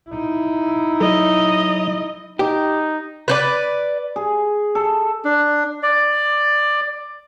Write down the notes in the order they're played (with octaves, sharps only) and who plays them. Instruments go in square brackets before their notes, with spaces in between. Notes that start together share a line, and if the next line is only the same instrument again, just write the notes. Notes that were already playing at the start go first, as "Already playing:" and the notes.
[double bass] D#4 E4
[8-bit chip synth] F#3 [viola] D#5
[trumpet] D#4 [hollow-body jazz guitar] G4
[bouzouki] B4 C5 D5
[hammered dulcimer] G#4
A4
[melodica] D4
D5